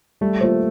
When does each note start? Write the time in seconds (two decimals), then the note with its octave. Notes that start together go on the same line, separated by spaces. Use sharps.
0.21 G3 A3
0.41 A#3 F4 C5